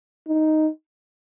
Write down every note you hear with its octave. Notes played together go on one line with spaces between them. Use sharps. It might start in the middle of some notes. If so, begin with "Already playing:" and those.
D#4